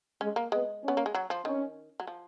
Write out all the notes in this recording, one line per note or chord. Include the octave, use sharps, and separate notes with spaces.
G#3 C#4
A#3
G#3 B3
B3 C#4
A#3
G#3
F#3
F3
D#3 C#4
F#3
F3